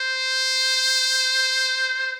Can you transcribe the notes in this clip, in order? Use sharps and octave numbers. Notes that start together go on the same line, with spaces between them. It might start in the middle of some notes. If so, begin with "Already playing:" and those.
Already playing: C5